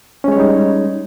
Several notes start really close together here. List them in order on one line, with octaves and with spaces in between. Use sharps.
C#4 G#3 C#5 G3 D#4